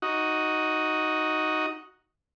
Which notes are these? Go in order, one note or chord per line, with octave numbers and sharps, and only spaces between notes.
D#4 F#4